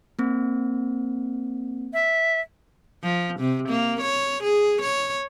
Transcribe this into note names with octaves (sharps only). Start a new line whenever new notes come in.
A#3 C4
E5
F3
C3
A#3
C#5
G#4
C#5